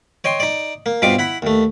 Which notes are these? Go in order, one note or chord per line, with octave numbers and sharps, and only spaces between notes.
C#5 D#5 G5 C6
D#4 D5
A#3
G2 B2 C4 F4 D#5 D6
E4 F#5 B5
D#2 A3